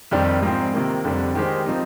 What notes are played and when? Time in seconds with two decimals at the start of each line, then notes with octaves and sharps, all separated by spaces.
0.11 F2 D#3 G3 D4 G4
0.42 G#2 F3 C4
0.73 C3 D#3 A#3
1.05 F2 D3 G3 D4
1.35 D#3 G#3 D#4 G4 C5
1.66 F3 C4 D#4